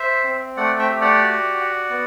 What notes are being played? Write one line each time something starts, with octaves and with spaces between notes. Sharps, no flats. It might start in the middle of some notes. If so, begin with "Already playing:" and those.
Already playing: C5 E5
C4
A3 D5 F#5
E5 G5
G4
D5 F#5
F#4
F#4
B3